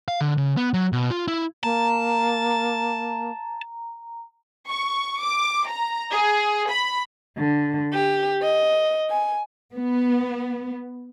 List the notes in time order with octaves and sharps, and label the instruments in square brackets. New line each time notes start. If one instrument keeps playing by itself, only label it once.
[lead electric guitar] F5
D3
C#3
B3
F#3
B2
F4
E4
[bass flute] A#3 [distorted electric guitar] A5 [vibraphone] A#5
[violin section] C#6
D6
A#5
G#4
B5
[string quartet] D3
G4
D#5
G#5
[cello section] B3